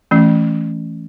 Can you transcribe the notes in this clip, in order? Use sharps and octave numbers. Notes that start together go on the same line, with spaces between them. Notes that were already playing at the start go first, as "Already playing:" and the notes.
E3 A3 C#4